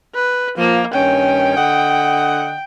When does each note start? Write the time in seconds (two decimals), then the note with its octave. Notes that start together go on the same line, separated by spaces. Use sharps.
0.15 B4
0.58 F3 A#3
0.94 G2 D#3 C#4 G5
1.57 D3 D#5 F#5